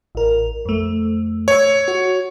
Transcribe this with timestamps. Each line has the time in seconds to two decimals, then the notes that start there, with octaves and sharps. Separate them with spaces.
0.15 A1 A#4
0.65 F2 A3
1.48 C#5 E6 G#6
1.88 F#4